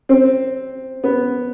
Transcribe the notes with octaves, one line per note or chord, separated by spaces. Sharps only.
C4
B3